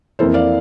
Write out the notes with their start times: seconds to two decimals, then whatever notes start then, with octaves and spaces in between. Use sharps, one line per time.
0.19 F2 E3 A#3 E4 A4 C5
0.34 D5 F5